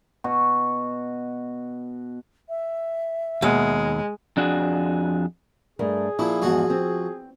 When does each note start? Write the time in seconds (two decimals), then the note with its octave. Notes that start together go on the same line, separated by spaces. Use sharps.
0.24 B2 F#4
2.49 E5
3.42 D#2 B2 G#3 F5
4.37 F2 D4 F#4 G#4
5.79 G2 A3 G#4 A#4
6.19 A#2 F3 E4
6.42 E2 G#2 F3 F#4
6.70 C4